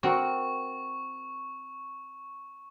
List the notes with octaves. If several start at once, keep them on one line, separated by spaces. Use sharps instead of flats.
C4 F#4 A#4 C#6